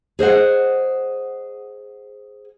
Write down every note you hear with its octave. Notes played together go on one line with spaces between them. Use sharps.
G#4 C5 D#5 F#5